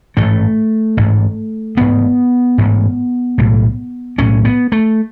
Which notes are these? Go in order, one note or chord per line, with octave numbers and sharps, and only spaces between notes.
A1 G#2 A3
A1 G#2
A1 G#2 B3
A1 G#2
B1 A2
B1 A2 C#4
B3
A3